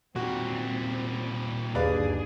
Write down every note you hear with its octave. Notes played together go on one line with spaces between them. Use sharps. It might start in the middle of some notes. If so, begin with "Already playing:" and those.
A#2 G3 C4 F#4
G1 D#2 D4 G#4 B4 D5 F5